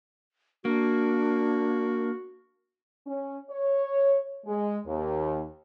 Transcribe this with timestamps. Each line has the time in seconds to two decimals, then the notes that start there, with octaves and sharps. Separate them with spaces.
0.65 A#3 D4 F#4
3.06 C#4
3.49 C#5
4.46 G#3
4.86 D#2